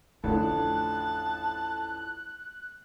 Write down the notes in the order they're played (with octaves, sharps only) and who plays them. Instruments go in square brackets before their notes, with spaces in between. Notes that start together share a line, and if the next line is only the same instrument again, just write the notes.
[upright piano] A1 F2 D3 [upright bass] A3 [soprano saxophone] A5 [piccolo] F#6